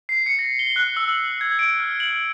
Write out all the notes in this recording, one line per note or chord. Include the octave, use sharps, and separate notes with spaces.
C7
C#7
A#6
G7
F#6
E6
F#7
G#6
D7
F6
F#7